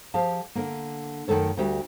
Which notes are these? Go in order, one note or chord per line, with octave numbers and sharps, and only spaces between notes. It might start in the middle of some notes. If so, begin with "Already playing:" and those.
F3 G4 G#4 F5 A5
D3 A#3
F#2 D#3 A3 A4 C#5
D2 G3 F#4 G4 E5